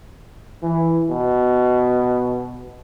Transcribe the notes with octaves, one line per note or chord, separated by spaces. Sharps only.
E3
B2